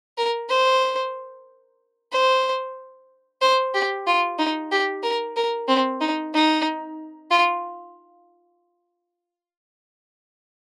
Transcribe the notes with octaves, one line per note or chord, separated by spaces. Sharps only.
A#4
C5
C5
C5
G4
F4
D#4
G4
A#4
A#4
C4
D#4
D#4
F4